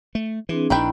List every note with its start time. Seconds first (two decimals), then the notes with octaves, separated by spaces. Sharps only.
0.15 A3
0.49 E3 C4 D4 G#4
0.70 A#1 D#3 D4 E4 B4 G5